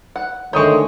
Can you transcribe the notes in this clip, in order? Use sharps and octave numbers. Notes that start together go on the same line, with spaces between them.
F#5
D3 D#3 G#3 A3 C#5 C#6 D#6 G6